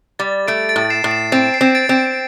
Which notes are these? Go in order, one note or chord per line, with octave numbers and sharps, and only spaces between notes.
G3 A6
A3 A6 D7
A6 D7
A2
C7 E7
A2
C7 E7
C4 A6 D7
C7
C4
A6 D7
C4